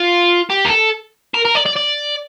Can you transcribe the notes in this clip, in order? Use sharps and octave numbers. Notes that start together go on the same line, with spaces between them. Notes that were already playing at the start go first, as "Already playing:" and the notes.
Already playing: F4
G4
A#4
A4
A#4
A#4
D5
D5
D5